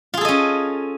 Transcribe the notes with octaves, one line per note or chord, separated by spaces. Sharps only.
C#4 F4 G#4 A4 D#5